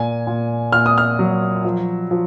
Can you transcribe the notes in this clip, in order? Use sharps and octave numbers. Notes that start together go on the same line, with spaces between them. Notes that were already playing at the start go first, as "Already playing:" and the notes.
Already playing: A#2 G#5
A#2
A#2 F6
D#6
F6
F#3
F3
F3